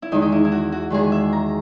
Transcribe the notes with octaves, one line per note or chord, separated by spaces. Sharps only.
E4
E2 D#3 G#3 D#4
D#4
E4
E4
F#4
F#4
E2 D#3 G#3 G#4
E5
A#5